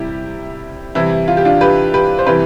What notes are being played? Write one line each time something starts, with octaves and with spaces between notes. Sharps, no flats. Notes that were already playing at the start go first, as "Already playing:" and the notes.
Already playing: C3 G3 E4 G4
C3 E3 G3 E4
F4
G4
D4 F4
G4 B4
G4 B4
C5
C3 E3 G3 G4 B4